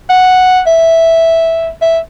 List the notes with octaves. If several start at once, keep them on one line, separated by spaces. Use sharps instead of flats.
F#5
E5
E5